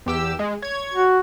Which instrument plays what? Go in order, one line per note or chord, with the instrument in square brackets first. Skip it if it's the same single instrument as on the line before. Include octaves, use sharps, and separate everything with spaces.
[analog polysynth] E2 G4 E6
G#3
C#5 G#6
[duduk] F#4